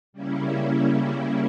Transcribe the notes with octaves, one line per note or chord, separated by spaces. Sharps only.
C#3 G3 A#3 C#4 E4